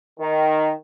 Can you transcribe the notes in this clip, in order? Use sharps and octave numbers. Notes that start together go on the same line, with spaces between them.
D#3